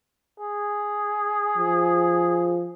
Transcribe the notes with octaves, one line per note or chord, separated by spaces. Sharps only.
G#4
F3